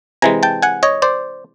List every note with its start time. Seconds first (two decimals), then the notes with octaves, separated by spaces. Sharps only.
0.22 C3 E3 G#3 G#5 A#5
0.43 G5 A5
0.63 F#5 G#5
0.83 C#5 D#5
1.02 C5 D5